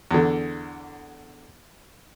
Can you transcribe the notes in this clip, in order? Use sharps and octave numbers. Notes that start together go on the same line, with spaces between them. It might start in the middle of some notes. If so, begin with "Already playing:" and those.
E2 D3